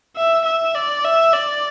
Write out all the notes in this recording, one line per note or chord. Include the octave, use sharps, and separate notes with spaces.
E5
E5
D5
E5
D5